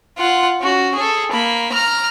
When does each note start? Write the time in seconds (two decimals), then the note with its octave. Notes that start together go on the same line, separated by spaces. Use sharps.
0.18 F4 F#5
0.61 C#4 F#4
0.95 G#4 A4
1.32 A#3 B5
1.72 A#5 F6